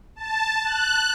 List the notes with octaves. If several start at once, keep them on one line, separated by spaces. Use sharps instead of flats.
A5
F#6